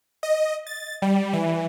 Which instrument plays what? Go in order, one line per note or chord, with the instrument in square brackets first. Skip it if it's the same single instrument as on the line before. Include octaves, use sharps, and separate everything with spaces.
[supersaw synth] D#5
A6
G3
E3